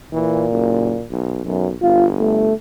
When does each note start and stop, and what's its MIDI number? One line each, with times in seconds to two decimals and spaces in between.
0.12 1.05 46
0.12 0.46 52
0.52 0.95 30
1.11 1.42 35
1.45 1.74 35
1.45 1.67 42
1.82 2.52 31
1.82 2.08 65
2.20 2.54 57